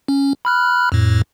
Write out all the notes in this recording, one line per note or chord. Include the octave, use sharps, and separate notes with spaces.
C#4
B5 F6 F#6
F2 A2